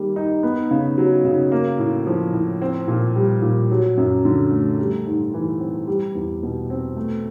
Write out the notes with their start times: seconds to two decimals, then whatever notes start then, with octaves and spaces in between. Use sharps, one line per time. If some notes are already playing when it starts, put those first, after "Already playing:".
Already playing: D#3 G3 A#3
0.16 D#4
0.43 B3
0.71 C#3
0.98 F#3
1.25 C#3
1.52 A#3
1.79 A2
2.07 F3
2.33 A2
2.62 C4
2.88 A#2
3.15 G3
3.42 A#2
3.70 F#3
3.97 F#2
4.25 D3
4.51 A3
4.79 G3
5.07 G#2
5.34 E3
5.60 C4
5.87 G3
6.15 E2
6.43 B2
6.70 C4
6.96 A3